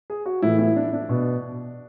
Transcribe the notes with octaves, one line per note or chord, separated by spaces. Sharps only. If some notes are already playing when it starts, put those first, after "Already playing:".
G#4
F#4
A2 E3 E4
E4
D4
D4
B2